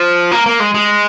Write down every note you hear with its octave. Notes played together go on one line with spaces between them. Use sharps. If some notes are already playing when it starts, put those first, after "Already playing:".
Already playing: F3
A#3
A#3
G#3
G#3